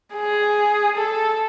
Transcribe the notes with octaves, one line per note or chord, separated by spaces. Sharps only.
G#4
A4